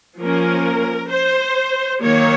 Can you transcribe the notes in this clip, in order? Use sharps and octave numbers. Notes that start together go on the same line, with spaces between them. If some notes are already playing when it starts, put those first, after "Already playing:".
F3 A#3 C#4 A#4
C5
D#3 F#3 A#3 C#5